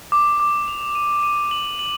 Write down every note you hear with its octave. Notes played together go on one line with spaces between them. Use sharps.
D6
D6
F7
D#7
D#7
F#7
F#7